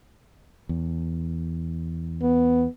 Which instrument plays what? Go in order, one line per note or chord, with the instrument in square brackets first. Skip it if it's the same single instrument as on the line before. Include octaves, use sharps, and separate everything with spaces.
[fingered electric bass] E2
[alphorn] B3